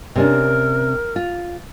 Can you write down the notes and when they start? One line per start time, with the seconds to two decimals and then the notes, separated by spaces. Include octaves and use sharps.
0.15 C3 C#4 D4 A#4
1.16 F4